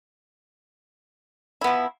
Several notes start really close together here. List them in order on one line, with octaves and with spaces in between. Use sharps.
E4 B3 F3